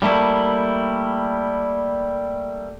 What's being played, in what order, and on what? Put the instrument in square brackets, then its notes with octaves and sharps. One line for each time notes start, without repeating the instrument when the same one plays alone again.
[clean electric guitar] G3 A3 A#3 E4